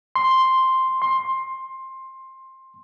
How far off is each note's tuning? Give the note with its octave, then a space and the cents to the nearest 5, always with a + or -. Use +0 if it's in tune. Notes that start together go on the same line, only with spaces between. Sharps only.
C6 +0
C6 +15